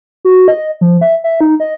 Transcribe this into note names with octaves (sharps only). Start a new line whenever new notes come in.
F#4
D#5
F3
E5
E5
D#4
D#5